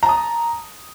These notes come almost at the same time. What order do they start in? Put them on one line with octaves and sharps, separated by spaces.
A#5 A5 D#6